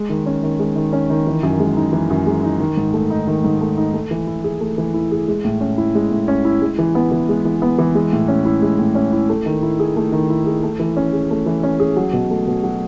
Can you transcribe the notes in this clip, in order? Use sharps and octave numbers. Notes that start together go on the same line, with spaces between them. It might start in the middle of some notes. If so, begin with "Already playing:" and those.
Already playing: G#3
D#3
C#4
D#3
G#3
D#3
C#4
D#3
E3
F#2
G#3
D#4
E3
F#2
G#3
D#4
D#3
G#2
A3
D#4
D#3
G#2
A3
D#4
A3
E3
E4
G#4
A3
E3
E4
G#4
G#3
A2
C#4
E4
G#3
A2
C#4
E4
G#3
E3
B3
E3
G#3
E3
B3
E3
G#3
A2
C#4
E4
G#3
A2
C#4
E4
A3
D#3
E4
G#4
A3
D#3
E4
G#4
A3
E3
C#4
G#4
A3
E3
C#4
G#4
F#3
B2
A3
B2
F#3